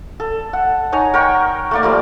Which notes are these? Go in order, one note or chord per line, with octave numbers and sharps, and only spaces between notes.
A4
F#5
D#4 C#5 G#5 A#5
A#4 F#5 G5 C#6
A3 A#3 D5
F3 G3 A3